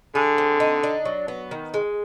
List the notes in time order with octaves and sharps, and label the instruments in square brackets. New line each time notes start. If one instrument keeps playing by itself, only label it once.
[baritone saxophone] D3 [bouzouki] G#4
[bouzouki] C4
D#4
D4
F#3
B3
D#3
G#3